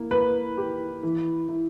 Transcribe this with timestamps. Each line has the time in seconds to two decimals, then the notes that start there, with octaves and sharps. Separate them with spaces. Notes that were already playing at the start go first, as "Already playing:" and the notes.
Already playing: A#3 E4
0.11 A#3 B4
0.57 G4
1.03 E3
1.49 E4